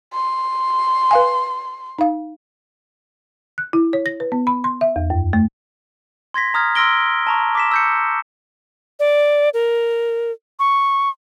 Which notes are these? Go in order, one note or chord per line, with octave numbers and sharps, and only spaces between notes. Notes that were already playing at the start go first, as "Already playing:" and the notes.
C6
B4 F5 G#5
D#4 F5
F#6
E4
C#5
A#6
B4
B3
B5
C6
E5
E2
F#2
A3
C6 G#6 A#6 B6
A#5 D#6 F6 G#6
C6 E6 F6 A#6 D7 G7
A5 A#5 C#6
D6 B6 E7
E6 G6 C#7
D5
A#4
C#6